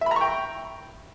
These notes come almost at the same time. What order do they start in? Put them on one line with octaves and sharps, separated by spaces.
E5 B5 A#5 C#6 G5